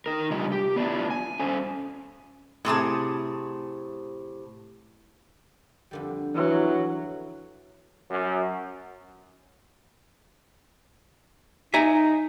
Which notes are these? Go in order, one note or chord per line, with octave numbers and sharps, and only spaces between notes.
D#4 A#4
C3 G3 D4 F4 D#5
G4
B3 D4 E4 F4
G#5
C#4 A4 C5
A2 C3 G#4 A5
F2 D3 G3
E3 F#3
F#2
D#4 E5 G#5 A#5